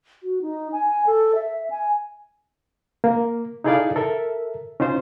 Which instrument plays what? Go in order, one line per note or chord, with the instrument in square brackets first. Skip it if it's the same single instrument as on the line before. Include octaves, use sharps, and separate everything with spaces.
[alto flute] F#4
D#4
G#5
A4
E5
G#5
[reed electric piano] A#3
D#4 E4 G#4 A4 D5 F5
A4 A#4 E5
C#4 D#4 F4 C5